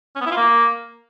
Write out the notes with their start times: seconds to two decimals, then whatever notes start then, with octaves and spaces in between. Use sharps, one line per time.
0.16 C#4
0.21 B3
0.26 E4
0.31 F4
0.37 A#3